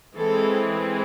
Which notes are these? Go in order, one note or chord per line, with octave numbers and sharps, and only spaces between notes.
E3 G#3 C4 A4